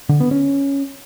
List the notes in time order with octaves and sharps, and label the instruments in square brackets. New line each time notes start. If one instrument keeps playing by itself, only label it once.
[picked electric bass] D3
B3
C#4